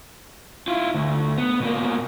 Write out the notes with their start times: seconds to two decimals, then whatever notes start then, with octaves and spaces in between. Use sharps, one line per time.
0.68 E4 F4
0.95 D2
1.38 B3
1.60 B2 A#3